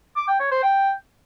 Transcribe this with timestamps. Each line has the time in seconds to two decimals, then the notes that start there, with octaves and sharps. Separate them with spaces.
0.16 D6
0.28 G5
0.40 C#5
0.51 C5
0.63 G5